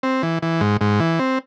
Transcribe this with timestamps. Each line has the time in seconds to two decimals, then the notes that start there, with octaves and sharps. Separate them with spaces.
0.03 C4
0.23 E3
0.42 E3
0.61 G#2
0.81 G#2
1.00 E3
1.19 C4